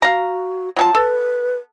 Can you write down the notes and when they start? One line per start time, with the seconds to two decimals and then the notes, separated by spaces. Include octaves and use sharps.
0.02 F#4 F5 A#5
0.76 F#3 F4 G#4 A5
0.95 A4 B4